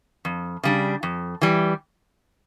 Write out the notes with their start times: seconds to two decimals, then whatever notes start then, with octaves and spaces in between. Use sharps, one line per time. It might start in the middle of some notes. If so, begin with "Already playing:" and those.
0.25 F2
0.63 C#3 G3 D4
1.03 F2
1.42 E3 G3